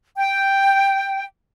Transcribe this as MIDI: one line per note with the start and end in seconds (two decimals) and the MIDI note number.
0.17 1.24 79